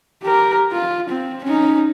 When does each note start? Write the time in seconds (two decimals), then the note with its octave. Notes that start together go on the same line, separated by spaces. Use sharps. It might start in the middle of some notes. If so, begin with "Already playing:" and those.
0.23 G4 A#4
0.72 F4
1.09 C4
1.44 C#4 D#4